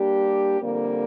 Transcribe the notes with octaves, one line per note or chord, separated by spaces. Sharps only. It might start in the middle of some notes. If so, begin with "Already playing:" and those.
Already playing: G3 A#3 D4 G4
F2 D3 G3 A#3